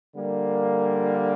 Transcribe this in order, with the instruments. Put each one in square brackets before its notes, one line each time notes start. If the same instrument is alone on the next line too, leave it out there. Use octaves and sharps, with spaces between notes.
[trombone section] D3 G3 A#3